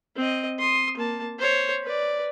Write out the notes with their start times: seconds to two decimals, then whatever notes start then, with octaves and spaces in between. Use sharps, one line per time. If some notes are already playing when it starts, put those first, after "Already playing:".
0.16 C4 D#5
0.59 C6 D#6
0.97 A#3 A5
1.39 C5 C#5
1.83 B4 D5